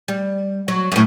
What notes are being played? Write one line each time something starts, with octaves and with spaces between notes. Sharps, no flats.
G3
F#3
F#2 A2